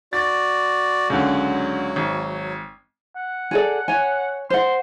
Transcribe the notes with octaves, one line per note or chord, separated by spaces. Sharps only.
F#4 D5 A6
C#2 D3 F#3
G#1
F#5
G#4 A4 D5
C#5 G#5
C5 F#5 C6